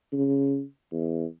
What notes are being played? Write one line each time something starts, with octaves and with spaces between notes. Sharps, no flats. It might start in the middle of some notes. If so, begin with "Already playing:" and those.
C#3
E2